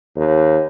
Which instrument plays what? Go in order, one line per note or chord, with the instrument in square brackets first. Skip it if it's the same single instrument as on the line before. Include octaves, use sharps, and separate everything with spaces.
[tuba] D#2